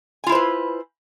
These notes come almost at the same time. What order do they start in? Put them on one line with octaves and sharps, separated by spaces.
G#5 F4 E4 C5 B4